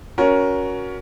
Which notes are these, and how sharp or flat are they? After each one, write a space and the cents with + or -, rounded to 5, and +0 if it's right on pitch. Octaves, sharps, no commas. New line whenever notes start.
C#4 +15 F#4 +0 A#4 +15